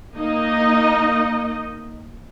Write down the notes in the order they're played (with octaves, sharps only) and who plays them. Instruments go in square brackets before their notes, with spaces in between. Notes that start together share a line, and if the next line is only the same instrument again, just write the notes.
[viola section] A#3 D#4 D#5